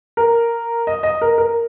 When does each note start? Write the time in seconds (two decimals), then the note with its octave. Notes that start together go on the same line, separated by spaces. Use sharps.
0.17 A#4
0.87 D#5
1.03 D#5
1.21 A#4
1.38 A#4